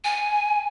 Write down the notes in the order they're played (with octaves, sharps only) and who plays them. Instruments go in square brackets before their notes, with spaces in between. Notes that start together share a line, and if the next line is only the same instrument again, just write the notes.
[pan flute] G#5